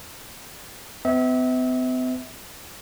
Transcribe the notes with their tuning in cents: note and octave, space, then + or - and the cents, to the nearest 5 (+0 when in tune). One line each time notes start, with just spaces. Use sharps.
B3 +45 E5 -30